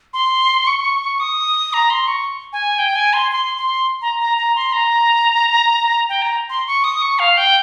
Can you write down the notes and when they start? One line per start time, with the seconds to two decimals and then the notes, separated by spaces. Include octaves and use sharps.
0.13 C6
0.67 C#6
1.20 D#6
1.73 A#5
1.90 C6
2.07 C#6
2.53 G#5
2.79 G5
2.96 G#5
3.13 C6
3.32 C6
3.58 C6
4.02 A#5
4.20 A#5
4.38 A#5
4.56 C6
4.73 A#5
6.09 G5
6.22 A#5
6.50 C6
6.67 C#6
6.84 D#6
7.02 C#6
7.19 F5
7.37 G5